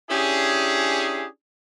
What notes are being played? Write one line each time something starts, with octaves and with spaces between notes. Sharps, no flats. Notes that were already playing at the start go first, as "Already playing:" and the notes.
C#4 D4 E4 G4 G#4